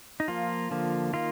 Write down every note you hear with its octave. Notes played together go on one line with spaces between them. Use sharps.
D#4
F3 A#3 F4
D3 F3 A#3
D#3 A#3 F4